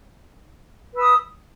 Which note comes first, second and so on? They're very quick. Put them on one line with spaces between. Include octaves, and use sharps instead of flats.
B4 E6 D#6